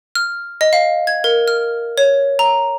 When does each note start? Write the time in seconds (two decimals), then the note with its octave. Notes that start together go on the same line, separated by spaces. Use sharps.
0.15 F6
0.61 D#5
0.73 F5
1.07 G#6
1.24 A#4
1.48 F6
1.98 C#5
2.39 A#5